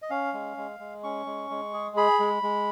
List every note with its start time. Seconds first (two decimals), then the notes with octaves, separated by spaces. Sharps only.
0.02 D#5
0.10 C#4 F5
0.34 G#3
0.57 G#3
0.79 G#3
1.03 C#4 C#6
1.26 G#3
1.50 G#3
1.74 G#4
1.97 G#4 B5
2.20 G#3
2.43 G#3